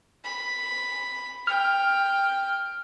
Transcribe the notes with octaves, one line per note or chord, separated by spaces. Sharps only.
B5
G5 F6